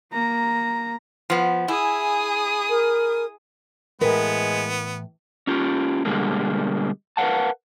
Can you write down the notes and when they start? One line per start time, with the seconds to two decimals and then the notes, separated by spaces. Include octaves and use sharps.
0.12 A#3 A#5
1.30 F3 B3
1.68 E4 G#4 G#5 D#6
2.69 A#4
4.01 A2 E3 G#3 B3 A#4 B4
5.47 C#4 F4 G4
6.05 B2 D3 G3 G#3 A#3
7.17 A#4 B4 C#5 F5 F#5 A5